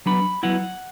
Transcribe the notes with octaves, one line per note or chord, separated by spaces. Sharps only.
F#3 B3 D4 B5
F#3 B3 E4 F#5